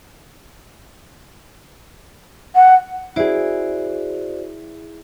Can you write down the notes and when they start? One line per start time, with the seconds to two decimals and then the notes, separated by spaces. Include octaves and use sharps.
2.55 F#5
3.16 E4 F#4 G#4 C5 D5